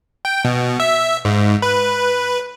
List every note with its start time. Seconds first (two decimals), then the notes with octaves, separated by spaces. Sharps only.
0.25 G5
0.45 B2
0.80 E5
1.25 G#2
1.62 B4